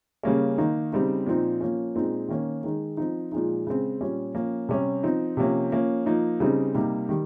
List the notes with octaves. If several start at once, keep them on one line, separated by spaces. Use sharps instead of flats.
C#3 G3 A#3 C#4
D#3 A#3 D#4
C#3 G3 C4 D#4
A#2 F3 C4 D#4
F3 A#3 C#4
A#2 G#3 C4 D#4
D#3 A#3 C#4
D#3 G#3 D#4
F3 C4 D#4
A#2 F3 G#3 D#4
C#3 G#3 C4
A#2 G3 C#4
F3 A#3 C#4
C3 G3 C#4
F3 C4 D#4
C3 F3 A#3 C#4
F3 A#3 C#4
F3 A#3 D#4
C#3 G3 C4 D#4
C3 G3 A#3 D#4
D#3 G3